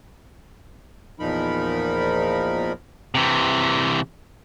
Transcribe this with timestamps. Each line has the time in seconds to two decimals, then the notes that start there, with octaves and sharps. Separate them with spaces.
1.20 E2 A#2 F3 D#4 A#4 B5
3.15 C3 E3